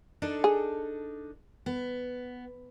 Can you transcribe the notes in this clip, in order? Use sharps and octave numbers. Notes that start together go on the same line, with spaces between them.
D4 D#4 A4
G#4
B3